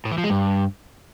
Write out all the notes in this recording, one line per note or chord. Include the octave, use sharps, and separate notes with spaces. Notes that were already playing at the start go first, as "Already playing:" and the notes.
A2
E3
F3
G#3
G2